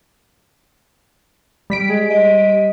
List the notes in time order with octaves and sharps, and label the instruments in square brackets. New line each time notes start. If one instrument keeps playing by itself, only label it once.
[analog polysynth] G3 B6 D7
[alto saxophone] G#3
D#5